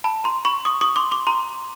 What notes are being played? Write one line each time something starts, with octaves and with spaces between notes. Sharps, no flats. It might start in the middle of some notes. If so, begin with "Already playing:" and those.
A5 B5
A#5 C6
B5 C#6
C#6 D#6
C#6 D#6
C6 D6
C6 D6
A#5 C6